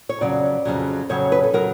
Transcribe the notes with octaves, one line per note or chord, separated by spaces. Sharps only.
C#5
F2 C#3 F#3 D5
F2 C#3 F#3
F2 C#3 F#3 C#5
B4
A4
C#3 F#3 A#4